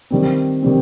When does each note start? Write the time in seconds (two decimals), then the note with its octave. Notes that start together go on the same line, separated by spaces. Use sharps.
0.11 D#3 G3 C4
0.63 D#3 G3 C4